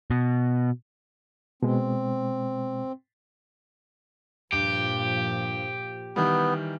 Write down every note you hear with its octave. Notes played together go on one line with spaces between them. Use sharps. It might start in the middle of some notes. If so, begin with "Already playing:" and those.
B2
B2 G#3 C4
G2 A#2 F3 G4
D#3 E3 G3 B3